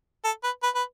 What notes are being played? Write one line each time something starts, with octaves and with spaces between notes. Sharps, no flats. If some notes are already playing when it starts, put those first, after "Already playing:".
A4
B4
B4
B4